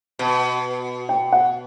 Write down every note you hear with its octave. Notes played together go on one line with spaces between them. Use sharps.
B2
G5
F#5